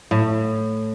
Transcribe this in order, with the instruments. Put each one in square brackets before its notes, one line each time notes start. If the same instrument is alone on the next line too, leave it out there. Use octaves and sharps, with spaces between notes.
[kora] A2